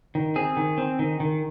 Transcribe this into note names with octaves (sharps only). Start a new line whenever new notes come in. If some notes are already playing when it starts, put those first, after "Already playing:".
D#3
C4 G#4
D#3
C4
D#3
D#3